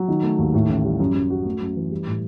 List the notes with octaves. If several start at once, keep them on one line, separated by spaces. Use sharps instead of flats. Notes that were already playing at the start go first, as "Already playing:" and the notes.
Already playing: F#3
D#3
A3
D#2
A2
A1
G3
F#2
F#2
F#4
A3
F#2
E3
G3
A2